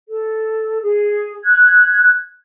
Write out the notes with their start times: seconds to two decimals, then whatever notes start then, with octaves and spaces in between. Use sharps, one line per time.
0.09 A4
0.82 G#4
1.44 F#6 G#6